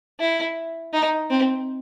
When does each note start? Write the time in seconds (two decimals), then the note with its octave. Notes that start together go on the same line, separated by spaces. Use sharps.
0.20 E4
0.93 D#4
1.30 C4